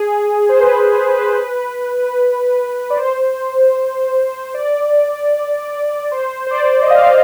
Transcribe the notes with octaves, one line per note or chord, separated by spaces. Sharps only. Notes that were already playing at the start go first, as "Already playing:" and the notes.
Already playing: G#4
C5
B4
G#4
B4
D5
C5
D5
C5
C5
D5
D#5
F5